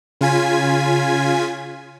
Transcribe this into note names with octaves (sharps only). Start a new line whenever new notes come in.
C#3 F4 G#5 G#6 B6